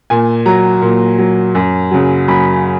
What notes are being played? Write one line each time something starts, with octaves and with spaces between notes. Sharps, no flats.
A#2 G#5
F#3 A#5
A#2
F#3
F#2
C#3 F#3
F#2 B5